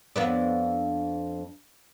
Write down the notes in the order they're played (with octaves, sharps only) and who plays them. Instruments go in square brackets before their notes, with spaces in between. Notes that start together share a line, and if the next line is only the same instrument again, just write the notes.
[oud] F2 B3 D4